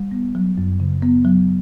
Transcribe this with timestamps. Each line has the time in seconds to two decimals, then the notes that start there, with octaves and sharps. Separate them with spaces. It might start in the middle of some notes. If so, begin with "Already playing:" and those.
Already playing: G3
0.11 B3
0.35 F#3
0.58 F#2
0.80 C#3
1.02 B3
1.25 F#3